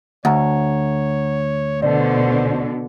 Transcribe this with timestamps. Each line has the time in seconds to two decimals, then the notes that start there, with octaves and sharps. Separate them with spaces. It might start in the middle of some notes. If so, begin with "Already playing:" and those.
0.25 D2 C#5 F#5 A#5
1.82 B2 D3 C5 D5